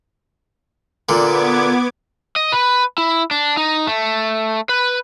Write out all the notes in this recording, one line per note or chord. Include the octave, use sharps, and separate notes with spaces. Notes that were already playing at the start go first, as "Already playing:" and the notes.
A#2 D3 B3 D6 G#6
D#5
B4
E4
D4
D#4
A3
B4